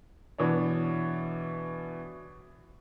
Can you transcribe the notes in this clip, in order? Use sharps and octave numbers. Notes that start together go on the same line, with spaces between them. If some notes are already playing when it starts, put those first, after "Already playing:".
B2 E3 D4 C#5